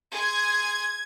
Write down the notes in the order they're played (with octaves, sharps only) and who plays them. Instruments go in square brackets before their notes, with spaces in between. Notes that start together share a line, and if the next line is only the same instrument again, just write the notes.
[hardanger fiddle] G#4 C6 [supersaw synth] G#6